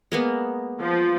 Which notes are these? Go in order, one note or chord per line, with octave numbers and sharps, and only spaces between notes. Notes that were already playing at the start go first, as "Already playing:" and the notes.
G#3 A#3 B3
F3